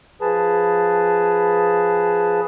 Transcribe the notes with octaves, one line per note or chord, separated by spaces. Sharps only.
F3 G#4 B4 A5